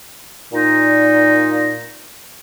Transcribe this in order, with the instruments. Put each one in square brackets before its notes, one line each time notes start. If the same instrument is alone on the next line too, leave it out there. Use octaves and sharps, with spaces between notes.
[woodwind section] A#2 D#4